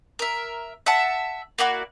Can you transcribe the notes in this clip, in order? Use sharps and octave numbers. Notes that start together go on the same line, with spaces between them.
A#4 E5
E5 F#5 A5
A#3 E4 F#4 D5